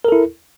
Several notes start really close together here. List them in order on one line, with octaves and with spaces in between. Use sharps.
A#4 A4 E4